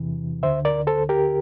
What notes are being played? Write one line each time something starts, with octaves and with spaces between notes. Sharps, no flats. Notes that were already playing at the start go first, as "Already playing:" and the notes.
Already playing: E2 C3 E3
D2 D3 C5 E5
A#4 D5
A4 C5
G4 A#4